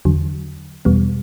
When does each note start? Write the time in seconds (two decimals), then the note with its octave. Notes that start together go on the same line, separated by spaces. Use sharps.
0.05 E2 D3 F#3
0.85 E2 B2 G3 B3